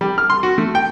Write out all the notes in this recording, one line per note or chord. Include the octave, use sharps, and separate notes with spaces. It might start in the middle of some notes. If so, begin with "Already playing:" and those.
G3
F6
C6
F#4
A3
G5